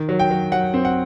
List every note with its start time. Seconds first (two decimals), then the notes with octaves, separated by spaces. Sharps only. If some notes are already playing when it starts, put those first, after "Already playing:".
Already playing: D#3
0.09 F#3
0.19 G5
0.30 F#3
0.52 F#3 F#5
0.74 C4
0.85 F#5